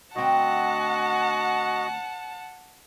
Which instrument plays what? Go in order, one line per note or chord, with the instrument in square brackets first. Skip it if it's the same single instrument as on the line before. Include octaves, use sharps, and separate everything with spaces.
[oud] D2 C4 [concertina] F#4 D#5 [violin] F#5 A5